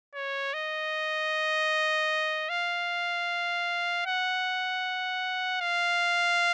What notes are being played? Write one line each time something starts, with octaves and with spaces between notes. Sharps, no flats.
C#5
D#5
F5
F#5
F5